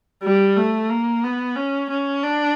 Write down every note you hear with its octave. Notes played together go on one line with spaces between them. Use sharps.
G3
A3
A#3
B3
C#4
C#4
D4